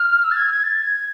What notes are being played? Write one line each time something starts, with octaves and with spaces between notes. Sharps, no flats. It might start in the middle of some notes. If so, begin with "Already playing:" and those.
Already playing: F6
E6
A6
G#6
G#6
A6
G#6